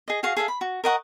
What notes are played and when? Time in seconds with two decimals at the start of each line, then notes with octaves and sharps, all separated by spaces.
0.08 G#4 D#5
0.23 F#4 G#4 F5 C#6
0.37 G#4 A4 E5 F5
0.48 B5
0.61 F#4
0.84 A#4 D#5 F#5 C#6